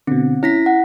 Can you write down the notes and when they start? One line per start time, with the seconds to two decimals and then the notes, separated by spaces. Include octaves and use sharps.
0.07 B2 D3 C4
0.43 C#4 E4 A#6 B6
0.66 F#5